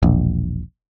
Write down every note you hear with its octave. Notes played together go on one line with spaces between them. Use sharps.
E1 A#1